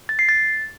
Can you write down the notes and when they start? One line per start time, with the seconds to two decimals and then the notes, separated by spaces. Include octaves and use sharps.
0.09 A6
0.19 C7
0.29 A6